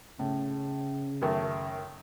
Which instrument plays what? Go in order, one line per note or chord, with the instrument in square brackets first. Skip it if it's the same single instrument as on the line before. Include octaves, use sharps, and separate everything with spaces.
[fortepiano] A2 [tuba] C#3
[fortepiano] F#2 D#3 A3